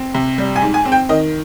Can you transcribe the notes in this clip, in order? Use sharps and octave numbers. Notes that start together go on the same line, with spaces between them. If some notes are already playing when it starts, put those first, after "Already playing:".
Already playing: C4
C3
G3
G#5
G#2
G#5
C4
G5
D#3 D#5